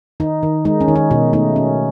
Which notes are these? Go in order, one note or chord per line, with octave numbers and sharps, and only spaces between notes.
D#3 D#4
D#3
G#3 D#4
C#4
D#3
D#4
B2 D#4
A3 D#4
C#4